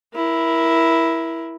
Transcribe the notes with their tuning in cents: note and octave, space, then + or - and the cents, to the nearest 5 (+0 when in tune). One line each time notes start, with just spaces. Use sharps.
E4 +0 A#4 +20